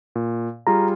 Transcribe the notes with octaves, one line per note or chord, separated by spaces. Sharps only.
A#2
G3 F4 G#4 A#5